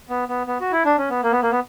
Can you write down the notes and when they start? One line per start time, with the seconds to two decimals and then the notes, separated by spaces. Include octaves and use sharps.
0.09 B3
0.28 B3
0.47 B3
0.60 F#4
0.72 E4
0.85 D4
0.98 C#4
1.10 B3
1.23 A#3
1.32 B3
1.42 A#3
1.51 B3